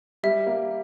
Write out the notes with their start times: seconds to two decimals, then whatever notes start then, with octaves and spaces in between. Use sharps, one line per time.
0.23 G3 E5
0.47 A#3